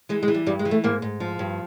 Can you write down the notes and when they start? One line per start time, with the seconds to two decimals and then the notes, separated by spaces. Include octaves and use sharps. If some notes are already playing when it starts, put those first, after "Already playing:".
0.09 E3 G#3
0.23 G#3
0.28 E3
0.34 G3
0.46 G2 G3
0.59 G#3
0.65 E3
0.71 A3
0.84 G#2 A#3
1.02 G#2
1.20 F3
1.39 G2